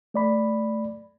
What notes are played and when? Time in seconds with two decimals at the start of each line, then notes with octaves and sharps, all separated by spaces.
0.14 A3 D5 B5